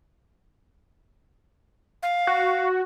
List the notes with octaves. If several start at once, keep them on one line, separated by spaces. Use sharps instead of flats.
F5
F#4